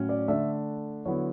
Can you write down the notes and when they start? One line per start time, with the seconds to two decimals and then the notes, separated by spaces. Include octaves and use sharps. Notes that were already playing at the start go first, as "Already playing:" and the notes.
Already playing: A2 F#3 C#4
0.09 D5
0.28 D3 A3 D4 E5
1.06 D3 F#3 B3 E4 C#5